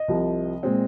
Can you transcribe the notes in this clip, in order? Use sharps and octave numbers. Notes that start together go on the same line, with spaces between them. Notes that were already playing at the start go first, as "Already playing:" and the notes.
Already playing: D#5
C2 C3 F3
A#2 G#3 C4